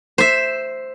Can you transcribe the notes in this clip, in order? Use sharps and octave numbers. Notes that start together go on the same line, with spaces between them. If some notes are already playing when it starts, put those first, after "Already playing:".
C5 E5